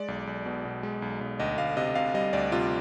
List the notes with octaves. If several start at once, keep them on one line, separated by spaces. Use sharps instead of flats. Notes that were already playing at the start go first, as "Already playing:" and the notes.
Already playing: G#3 D5
B1
B1
B2
B2
G#3
B1
B1
D2 D#5
D2 F5
C3 D#5
C3 F5
G3 D#5
D2 D5
C3 F4